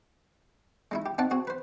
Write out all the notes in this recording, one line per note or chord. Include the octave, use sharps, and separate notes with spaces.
G#3 D#4 E4
G4
C4 D#4 D5 F#5 A5 D6
C4 F#4 G#4
B4 C5